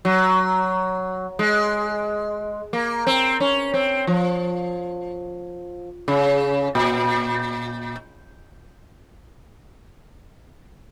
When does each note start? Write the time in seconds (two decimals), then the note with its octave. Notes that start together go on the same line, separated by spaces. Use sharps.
0.05 F#3
1.39 G#3
2.73 A#3
3.07 C4
3.40 C#4
3.74 C4
4.07 F3
6.08 C#3
6.75 A#2